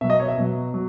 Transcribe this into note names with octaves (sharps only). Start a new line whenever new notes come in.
B2 F#3 E5
D#5
C#5
E5
B2 F#3
F#3